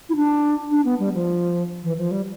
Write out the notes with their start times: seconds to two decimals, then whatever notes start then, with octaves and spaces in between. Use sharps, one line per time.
0.10 E4
0.16 D4
0.71 D4
0.85 B3
0.99 G3
1.14 F3
1.83 E3
1.98 F3
2.11 G3